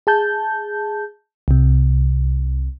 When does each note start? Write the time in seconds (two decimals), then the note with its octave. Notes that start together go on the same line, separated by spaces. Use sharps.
0.07 G#4 A5 G6
1.48 C2 C3